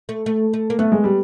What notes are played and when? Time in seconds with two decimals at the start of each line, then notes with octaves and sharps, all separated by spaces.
0.09 A3
0.26 A3
0.54 A3
0.70 A#3
0.79 A3 B3
0.92 G#3
1.04 G3